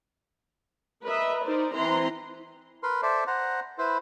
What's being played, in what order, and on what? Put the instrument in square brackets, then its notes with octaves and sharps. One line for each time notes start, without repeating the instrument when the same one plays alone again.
[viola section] A#4 B4 D#5 E5
D#4 A#4 C5 D5
E3 C4 A#5 C6
[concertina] A#4 B4 C6
A4 C5 D5 E5
C5 F#5 A#5
E4 B4 C5